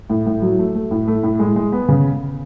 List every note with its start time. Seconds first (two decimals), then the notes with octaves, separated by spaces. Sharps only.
0.10 A2
0.26 A2
0.42 F#3
0.59 A3
0.75 A3
0.91 A2
1.08 A3
1.23 A2
1.39 G#3
1.56 G#3
1.72 B3
1.88 C#3